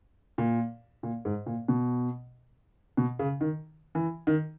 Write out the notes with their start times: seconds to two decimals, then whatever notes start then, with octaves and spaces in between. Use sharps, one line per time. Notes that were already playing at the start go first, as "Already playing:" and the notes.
0.38 A#2
1.03 A#2
1.25 G#2
1.46 A#2
1.68 B2
2.97 B2
3.19 C#3
3.41 D#3
3.95 E3
4.27 D#3